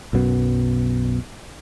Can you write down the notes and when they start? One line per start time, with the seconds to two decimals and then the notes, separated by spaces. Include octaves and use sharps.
0.13 B1 F#2 B2